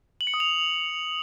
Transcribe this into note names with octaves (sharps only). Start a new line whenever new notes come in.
F#7
C#7
D#6
F7